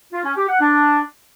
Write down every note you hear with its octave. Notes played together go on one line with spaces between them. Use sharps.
F4
C#4
G4
F#5
D4